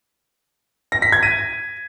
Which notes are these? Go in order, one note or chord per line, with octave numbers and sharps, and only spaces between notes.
A#6
B6
G#6
D#7